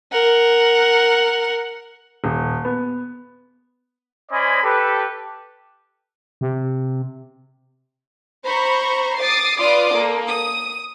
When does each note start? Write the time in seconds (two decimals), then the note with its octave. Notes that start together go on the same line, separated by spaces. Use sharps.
0.12 A#4 F#5
2.24 D#1
2.65 B3
4.31 C#4 C5 D5 D#5 G#5 B5
4.63 G4 A4 B4
6.41 C3
8.43 C5 A#5 B5 C#6
9.17 D6 D#6 A6 C7
9.60 F4 B4 D5 C6 D6 D#6
9.93 A#3 A4
10.27 D#6